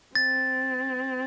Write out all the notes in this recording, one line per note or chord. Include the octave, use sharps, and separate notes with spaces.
C4 A6